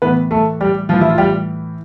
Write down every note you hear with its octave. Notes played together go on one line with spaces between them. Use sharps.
A2 E3 B3 B4
A3 A4
G3 G4
A2 E3 F3 F4
E4
F4
G3 G4